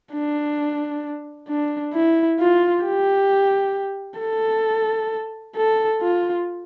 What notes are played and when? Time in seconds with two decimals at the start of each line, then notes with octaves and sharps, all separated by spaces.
0.13 D4
1.49 D4
1.94 E4
2.40 F4
2.85 G4
4.21 A4
5.57 A4
6.02 F4